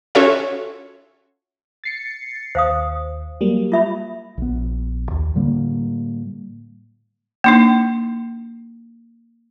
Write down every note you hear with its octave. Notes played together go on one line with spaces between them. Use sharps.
C#4 F4 F#4 A4 C#5 E5
A6 C7 C#7
D#2 C5 F5 D#6
F#3 G3 A#3
F4 E5 B5
A#1 B3
D#2
A2 D3 G3 A#3
A#3 D4 D#4